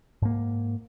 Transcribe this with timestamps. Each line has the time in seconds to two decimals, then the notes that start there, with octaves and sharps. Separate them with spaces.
0.22 G#2 A#3